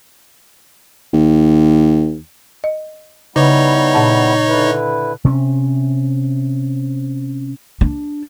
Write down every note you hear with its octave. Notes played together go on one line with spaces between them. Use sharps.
D#2
D#5
C#3 G3 B3 D#4 E4 C#5
A#2 F#5 A5
D3 E4 B4
C3 C#4
D4